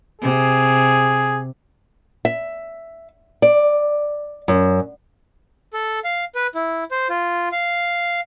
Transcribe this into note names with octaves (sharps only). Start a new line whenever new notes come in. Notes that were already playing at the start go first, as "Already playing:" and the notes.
C3 G#4
E5
D5
F#2
A4
F5
B4
E4
C5
F4
F5